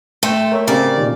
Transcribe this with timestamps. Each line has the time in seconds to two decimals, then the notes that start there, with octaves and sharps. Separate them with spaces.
0.23 A3 G5 C6 G6
0.52 A#4 C#5 E5
0.67 C#3 C4 G4 A#4 D5
0.98 A#2 D#3